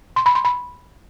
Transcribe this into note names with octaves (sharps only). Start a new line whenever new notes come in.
C6
B5
C6
B5